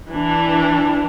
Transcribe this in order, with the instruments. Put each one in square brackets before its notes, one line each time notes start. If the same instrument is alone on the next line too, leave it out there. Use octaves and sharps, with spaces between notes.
[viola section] E3 D4